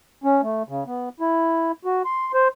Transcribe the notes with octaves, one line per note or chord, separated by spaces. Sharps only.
C#4
A3
C#3
B3
E4
F#4
C6
C5